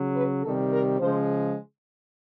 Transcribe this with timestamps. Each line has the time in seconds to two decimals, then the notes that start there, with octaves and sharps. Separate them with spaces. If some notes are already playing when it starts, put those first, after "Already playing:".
Already playing: C#3 F#3
0.15 B4
0.43 C3 D#3 G3 A4
0.72 A#4
0.99 C#3 F3 G#3 C5